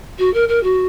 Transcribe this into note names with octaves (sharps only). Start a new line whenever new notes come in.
F#4
A#4
A#4
F#4